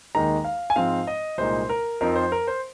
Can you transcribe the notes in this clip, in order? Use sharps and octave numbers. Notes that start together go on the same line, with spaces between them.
D#2 D#3 G#3 D#4 A#5
F5
G#5
G#2 F3 G#3 C4 F5
D#5
C2 A#2 G#3 D#4 C5
A#4
F2 F3 C4 D#4 A#4
C5
A#4
C5